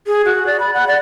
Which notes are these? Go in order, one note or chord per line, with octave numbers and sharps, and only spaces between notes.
G#4
F#4
D5
B5
F#5
D5